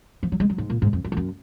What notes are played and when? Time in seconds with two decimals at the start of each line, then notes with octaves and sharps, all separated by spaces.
0.23 F3
0.32 F#3
0.40 G#3
0.50 F#3
0.58 G#2
0.70 A#2
0.82 G#2
0.93 F2
1.04 F#2
1.12 F2
1.17 F#2